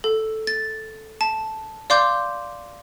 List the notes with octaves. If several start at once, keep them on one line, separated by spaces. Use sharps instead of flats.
A4
A6
A5
D5 F5 C6 D6 G6